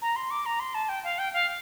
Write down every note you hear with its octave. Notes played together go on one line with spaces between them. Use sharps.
A#5
C6
D6
A#5
C6
A5
G5
F5
G5
F5